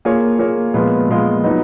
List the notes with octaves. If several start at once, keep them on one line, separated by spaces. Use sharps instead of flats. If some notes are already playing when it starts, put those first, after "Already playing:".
A#3 F4 G#4 C#5
A#3 F4 G#4 C#5
A#2 F3 G#3 B3 F4
A#2 F3 G#3 B3 F4
F#3 B3 D#4